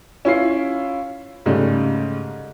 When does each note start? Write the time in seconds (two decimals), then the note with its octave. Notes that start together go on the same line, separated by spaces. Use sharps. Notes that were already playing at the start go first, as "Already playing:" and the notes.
0.25 C#4 E4 F4 C7
1.46 G#2 C#3 G3 A3